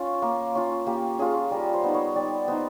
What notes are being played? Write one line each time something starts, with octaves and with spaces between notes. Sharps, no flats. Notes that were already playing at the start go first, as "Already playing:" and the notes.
Already playing: C#4 F4
A#3
C#4 F4
A#3 G4
C#4 F4 G#4
G3 A#4
C5
B3 D#4
C#5
G3 D5
B3 D#4 C5